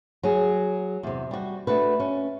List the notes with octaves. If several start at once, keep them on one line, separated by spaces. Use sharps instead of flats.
F#3 G#4
E2 C3
G3 F#4
A3 D4 F#4 B4
C#4